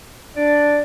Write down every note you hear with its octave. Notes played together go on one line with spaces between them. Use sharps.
D4 D5